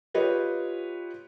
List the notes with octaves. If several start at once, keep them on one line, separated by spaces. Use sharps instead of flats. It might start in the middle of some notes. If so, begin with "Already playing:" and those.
F4 G4 B4 C#5 D#5